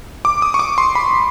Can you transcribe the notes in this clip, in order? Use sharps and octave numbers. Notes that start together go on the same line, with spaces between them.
D6
D#6
C#6
D6
C6
B5